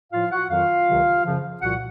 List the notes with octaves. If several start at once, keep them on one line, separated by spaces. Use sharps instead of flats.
A2 F3 F4 F5
F#4 F#5
F2 D#3 F#3 F4 F5
C#2 C3 D#3 F#3
F#2 C#3 F3
C2 A#2 F3 F#4 F#5